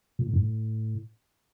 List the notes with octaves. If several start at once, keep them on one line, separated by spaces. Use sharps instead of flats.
A#2
A2
G2
A2